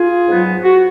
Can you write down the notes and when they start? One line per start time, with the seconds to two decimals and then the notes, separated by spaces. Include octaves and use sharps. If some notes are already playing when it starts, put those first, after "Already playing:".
Already playing: F4 G#4
0.27 G#2 F#3 B3
0.63 F#4